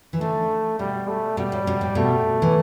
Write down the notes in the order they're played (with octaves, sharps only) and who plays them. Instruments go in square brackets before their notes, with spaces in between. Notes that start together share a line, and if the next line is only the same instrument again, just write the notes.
[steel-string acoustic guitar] E3
[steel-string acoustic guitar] D3 [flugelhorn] A3
[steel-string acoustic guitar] B2 [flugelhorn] G3
[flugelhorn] A3
[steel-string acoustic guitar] B2 [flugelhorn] G3
[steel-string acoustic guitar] A2
B2
A2
[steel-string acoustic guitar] B2 [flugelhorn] A3
[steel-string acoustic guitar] E3